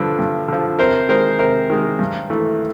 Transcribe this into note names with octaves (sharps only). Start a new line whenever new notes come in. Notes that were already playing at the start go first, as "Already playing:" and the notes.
Already playing: G2 D3 F3 B4
G2
D3 F3
C3 A#4 C5
D#3 G#3 A#4 C5
C3 A#4 C5
D#3 G#3
G2
E3 A3